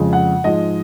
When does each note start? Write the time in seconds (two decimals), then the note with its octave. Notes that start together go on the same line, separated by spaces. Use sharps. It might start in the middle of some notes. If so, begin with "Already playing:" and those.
Already playing: F2 C#3 F3 G#3
0.13 F#5
0.44 G#2 F3 G#3 D#5